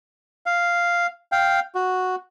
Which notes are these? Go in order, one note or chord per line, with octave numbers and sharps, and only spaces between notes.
F5
F5 G5
F#4